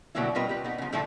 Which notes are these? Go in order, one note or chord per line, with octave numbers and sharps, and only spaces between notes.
B2 D3 F#3 G3 A#3 E4
G3 C4 F4 A#4 B4 D#5
G4 B4
B3 D#4
C#3 F3
A2 D3 F3 A3 E4 A4